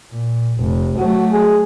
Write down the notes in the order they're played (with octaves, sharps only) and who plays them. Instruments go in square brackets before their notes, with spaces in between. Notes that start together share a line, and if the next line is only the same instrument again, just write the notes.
[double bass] A#2
F1
[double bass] F#3 A3 [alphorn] F#4
[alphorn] G#4